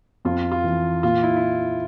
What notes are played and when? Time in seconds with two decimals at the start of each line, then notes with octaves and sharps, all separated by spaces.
0.25 F2 F4
0.52 F4
0.64 E3
1.03 A#2 F4
1.23 E4
1.37 E4